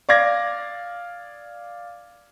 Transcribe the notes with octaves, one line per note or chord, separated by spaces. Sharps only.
D5 F5 D6 G#6 A#6